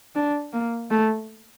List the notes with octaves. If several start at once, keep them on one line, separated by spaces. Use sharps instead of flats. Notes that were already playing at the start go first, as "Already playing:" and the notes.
D4
A#3
A3